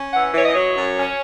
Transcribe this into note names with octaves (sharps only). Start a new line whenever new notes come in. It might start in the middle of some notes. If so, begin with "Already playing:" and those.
Already playing: C#4
E3 F#5
E3 C#5
D#5
F#3 C#5
F#2
C#4